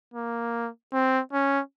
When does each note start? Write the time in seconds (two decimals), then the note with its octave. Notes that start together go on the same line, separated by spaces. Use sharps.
0.14 A#3
0.93 C4
1.33 C#4